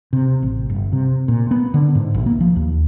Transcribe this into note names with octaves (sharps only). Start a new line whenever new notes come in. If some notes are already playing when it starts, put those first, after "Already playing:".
C3
A1
G1
C3
A#2
B3
D3
G#2
A#1
A#3
F3
D#2